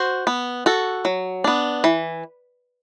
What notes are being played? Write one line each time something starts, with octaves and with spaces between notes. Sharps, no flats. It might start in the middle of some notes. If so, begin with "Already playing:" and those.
Already playing: F#4 C5
B3
F#4 A4
F#3
B3 D4
E3